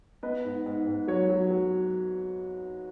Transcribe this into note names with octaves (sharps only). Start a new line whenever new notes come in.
B3 B4 D#5
G#2
G#2
G#2
F#3 C#5
F#3
F#3